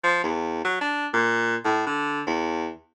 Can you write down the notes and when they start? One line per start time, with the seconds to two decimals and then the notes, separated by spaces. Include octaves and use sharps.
0.04 F3
0.23 E2
0.65 F#3
0.81 D4
1.14 A#2
1.65 A2
1.87 D3
2.27 E2